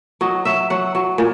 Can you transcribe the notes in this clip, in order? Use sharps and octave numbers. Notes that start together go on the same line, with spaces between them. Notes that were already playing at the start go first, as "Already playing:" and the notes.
F#3 D#5
F#3 E5
F#3 F#5
F#3
A#2